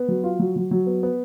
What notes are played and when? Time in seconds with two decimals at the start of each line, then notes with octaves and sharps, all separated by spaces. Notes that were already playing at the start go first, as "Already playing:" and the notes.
Already playing: B3
0.08 F#3
0.24 F4
0.39 F#3
0.56 F#3
0.71 F#3
0.87 B3
1.03 B3